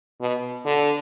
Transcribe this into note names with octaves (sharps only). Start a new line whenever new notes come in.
B2
D3